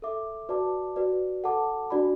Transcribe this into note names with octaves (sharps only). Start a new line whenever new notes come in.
A4 E5 D6
F#4 B4 D5 A5 D6
F#4 B4 D5
A4 F#5 A5 D6
D4 F#4 D5 B5